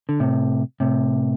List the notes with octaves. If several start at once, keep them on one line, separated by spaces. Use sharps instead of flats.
D3
A2 C3
A2 C3